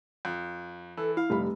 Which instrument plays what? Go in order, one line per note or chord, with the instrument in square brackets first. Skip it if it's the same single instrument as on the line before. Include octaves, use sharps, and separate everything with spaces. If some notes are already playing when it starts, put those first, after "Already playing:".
[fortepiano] F2
[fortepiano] E3 [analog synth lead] A4
[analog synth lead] E4 [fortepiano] F5
[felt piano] F1 G3 B5